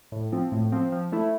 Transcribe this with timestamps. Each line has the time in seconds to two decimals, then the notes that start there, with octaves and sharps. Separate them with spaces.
0.12 A2
0.32 F3 C4
0.52 A2
0.72 F3 C4
0.92 F3
1.12 A3 E4